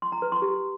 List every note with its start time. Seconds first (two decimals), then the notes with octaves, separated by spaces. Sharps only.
0.02 C6
0.12 A#5
0.22 B4
0.32 C6
0.42 G4